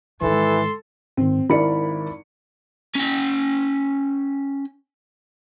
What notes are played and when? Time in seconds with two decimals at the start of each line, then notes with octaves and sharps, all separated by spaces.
0.21 G#2 D#3 E3 A4 C6
1.17 G#2 D#3 C4
1.50 G#1 E4 A#4 D5 B5 C#7
2.95 C#4 G5